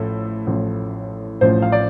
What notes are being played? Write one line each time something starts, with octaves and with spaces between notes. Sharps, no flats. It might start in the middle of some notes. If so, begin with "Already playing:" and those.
Already playing: A1 A2 F3 A4
A1 A2 F3
A1 A2 F3 C5
F5
D5